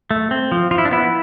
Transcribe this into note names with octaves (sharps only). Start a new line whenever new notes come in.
A3
C4
F3
F3 F4
E4
D4
B3 E4